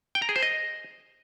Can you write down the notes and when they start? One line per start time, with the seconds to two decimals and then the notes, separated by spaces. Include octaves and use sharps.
0.15 G5
0.22 A#5
0.29 G#4
0.36 C5
0.43 D#5